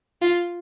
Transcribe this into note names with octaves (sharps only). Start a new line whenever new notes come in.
F4